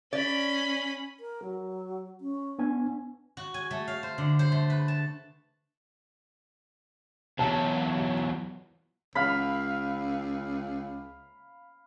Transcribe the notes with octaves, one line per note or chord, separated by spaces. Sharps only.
C#4 D5 B5
A#4
F#3
C#4
B3 D4 G#5
F#4
G#5
A3
F5
C5
D3
C5
A3
B4
A5
E2 F#3 A5
C#2 F5 B5